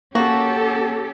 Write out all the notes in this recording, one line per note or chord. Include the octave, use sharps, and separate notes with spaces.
A#3 C#4 F#4 G4 A4